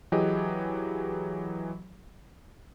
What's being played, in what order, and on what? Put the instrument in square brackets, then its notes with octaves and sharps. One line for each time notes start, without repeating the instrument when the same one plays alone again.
[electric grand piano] E3 F#3 G4 G#4 D#5